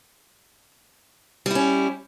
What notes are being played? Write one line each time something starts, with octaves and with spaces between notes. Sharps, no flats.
G3 C#4 E4